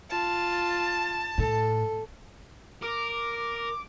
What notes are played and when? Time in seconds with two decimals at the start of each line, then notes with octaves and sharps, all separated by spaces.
0.10 F4 A5
1.38 A2 A4
2.82 A#4 D6